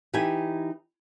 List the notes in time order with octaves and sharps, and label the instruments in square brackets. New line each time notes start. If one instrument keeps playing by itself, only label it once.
[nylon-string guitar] E3 D#4 E4 G4 G#5